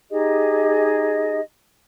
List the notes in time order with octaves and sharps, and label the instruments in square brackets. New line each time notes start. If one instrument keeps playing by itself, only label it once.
[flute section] D#4 G4 G#4 D#5